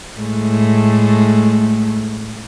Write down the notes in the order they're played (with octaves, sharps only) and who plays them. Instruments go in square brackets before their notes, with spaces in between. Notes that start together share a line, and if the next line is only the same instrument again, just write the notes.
[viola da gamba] A2 G#3 A3